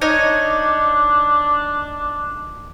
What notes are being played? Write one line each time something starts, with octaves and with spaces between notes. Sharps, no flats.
D4 D#4 C#5 D#5